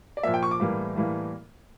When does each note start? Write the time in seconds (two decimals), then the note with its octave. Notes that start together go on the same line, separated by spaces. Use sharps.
0.17 D5
0.23 A#2 F3 A#3 E5
0.34 G5
0.43 C#6
0.51 D6
0.60 A2 E3 G3 A#3
0.96 A2 E3 G3 A#3